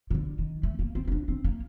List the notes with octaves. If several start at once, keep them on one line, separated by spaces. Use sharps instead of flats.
C3
D3
D#3
A3
A#3
C4
C4
D4
C4
A#3